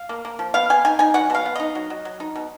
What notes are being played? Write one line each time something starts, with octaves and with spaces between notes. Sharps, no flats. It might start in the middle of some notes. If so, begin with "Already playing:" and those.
Already playing: F5
A#3
A#3
F3
B3 F5
B3 G#5
D#4 G#5
D#4 G#5
F#3 F#5
B2 F5
B3
D#4 D#5
F#3
F#3
F#3
D#4
B2